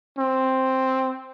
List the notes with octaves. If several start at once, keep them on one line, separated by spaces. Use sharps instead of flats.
C4